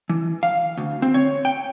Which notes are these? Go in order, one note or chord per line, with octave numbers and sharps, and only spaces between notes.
E3
F5
D2
C4
C#5
G5